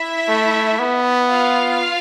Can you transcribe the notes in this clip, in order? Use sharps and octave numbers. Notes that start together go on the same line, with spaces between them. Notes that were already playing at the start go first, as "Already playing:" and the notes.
Already playing: E4 E5
A3
B3
F4 F5